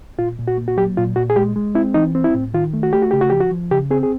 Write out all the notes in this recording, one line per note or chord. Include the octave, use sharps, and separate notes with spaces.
A#2 F4
A#2
F#4
A#3
F#4
F#3 G4
A#2 F4
A#2 F#4
G#4
G#3 G4
G#3
C4 E4
E3 D#4
C4
E4
A2
D#3 F4
A3
F#4
A3 G4
F#4
C#3 G4
F#4
F3 G4
F#4
F3
C#3 G4
C4 G#4
G#4